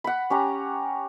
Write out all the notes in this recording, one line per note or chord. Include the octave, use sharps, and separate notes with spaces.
F#5 B5
C#4 G4 F#5 A#5